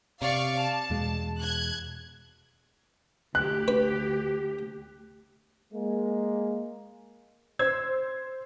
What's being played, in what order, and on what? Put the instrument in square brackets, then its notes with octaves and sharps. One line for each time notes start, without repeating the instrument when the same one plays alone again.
[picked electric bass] C3 [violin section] D5 F5 C#6
[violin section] A5
[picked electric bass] E2 B2 G#3
[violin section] F#6 G#6
[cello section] D2 G4 [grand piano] F#6
[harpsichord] B4
[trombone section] G#3 A#3
[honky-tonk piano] C5 E6 G#6